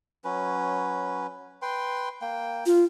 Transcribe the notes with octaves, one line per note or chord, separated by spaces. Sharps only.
F#3 C#4 B4
B4 G5 C6
A#3 G5
F4